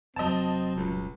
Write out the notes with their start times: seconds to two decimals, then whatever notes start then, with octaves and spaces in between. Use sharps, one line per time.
0.16 F1 F#3 C4 D#5 A5
0.76 D#1 C#2